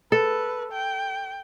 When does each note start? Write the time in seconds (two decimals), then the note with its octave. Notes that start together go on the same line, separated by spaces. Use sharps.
0.12 A4 B4
0.72 G5